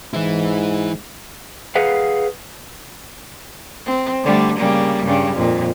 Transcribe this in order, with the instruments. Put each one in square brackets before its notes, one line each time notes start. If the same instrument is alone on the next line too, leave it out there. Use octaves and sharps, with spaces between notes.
[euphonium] G#2 [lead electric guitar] E3 E4
[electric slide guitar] G#4 B4 F5 F#5
[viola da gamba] C4
D3 G3 A3
C#3 G3 A#3
G2 C#3 G3
F2 A#2